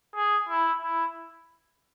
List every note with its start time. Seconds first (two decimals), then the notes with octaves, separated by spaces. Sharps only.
0.15 G#4
0.48 E4
0.82 E4